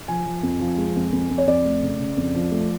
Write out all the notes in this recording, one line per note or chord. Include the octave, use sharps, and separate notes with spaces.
F3 G#5
F3
F2
F3
G#3
F2
F2
F2
C#5
F2 D5
A3
C#3
C#3
F2
F3
A3